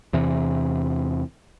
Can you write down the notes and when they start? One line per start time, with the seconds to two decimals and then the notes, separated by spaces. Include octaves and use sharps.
0.13 E2 C3 E3